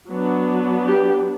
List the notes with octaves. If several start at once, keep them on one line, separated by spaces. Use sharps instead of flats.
F#3 B3 D4
G4